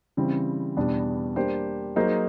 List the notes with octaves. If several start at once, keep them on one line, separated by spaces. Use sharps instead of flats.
C#3 E3 G3 C4
E2 B2 G3 B3 D4
G3 A#3 D4 G4 C5
F#3 A#3 D#4 G#4 C5